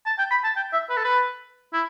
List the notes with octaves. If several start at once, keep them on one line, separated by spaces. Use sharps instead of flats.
A5
G5
B5
A5
G5
E5
B4
A4
B4
E4